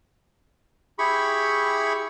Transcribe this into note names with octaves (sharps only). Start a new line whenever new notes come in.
E4 G4 G#4 B5 C#6